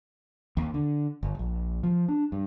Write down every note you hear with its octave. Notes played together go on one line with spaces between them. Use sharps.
D#2
D3
G1
A#1
F3
D4
G2